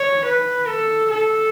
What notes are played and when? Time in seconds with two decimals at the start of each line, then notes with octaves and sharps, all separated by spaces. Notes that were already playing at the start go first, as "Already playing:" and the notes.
Already playing: C#5
0.25 B4
0.68 A4
1.10 A4